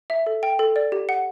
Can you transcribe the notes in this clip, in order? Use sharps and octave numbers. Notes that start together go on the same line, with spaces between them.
E5
A4
G5
A4
D5
G4
F#5